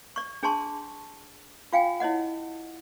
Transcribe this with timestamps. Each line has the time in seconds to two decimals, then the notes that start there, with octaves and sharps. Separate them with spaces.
0.16 D5 C#6
0.43 D4 G#4 D5 A5 C6 C#6
1.73 F4 F5 G5 G#5
2.00 E4 C#5 D#5 F#5